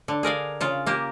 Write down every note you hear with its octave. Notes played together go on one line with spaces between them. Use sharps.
D3
G#4 A#4 D5 F5
C#3 F4
A#3 G4